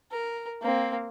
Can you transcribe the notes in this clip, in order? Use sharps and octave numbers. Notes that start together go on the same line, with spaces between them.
A#4
A#3 C4